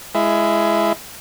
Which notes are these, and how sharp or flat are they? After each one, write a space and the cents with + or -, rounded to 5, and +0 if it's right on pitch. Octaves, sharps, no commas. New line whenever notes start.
G#3 +10 E4 +20